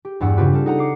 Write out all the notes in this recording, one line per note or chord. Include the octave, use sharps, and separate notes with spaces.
G4
E2 G2 F#5 E6
C#3 C4 F4 G4 B4
G3 C4 A4
D#4 F#5 A#5
D6 C7 C#7